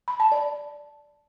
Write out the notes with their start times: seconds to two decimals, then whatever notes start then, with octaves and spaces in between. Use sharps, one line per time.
0.08 B5
0.20 A5
0.32 D5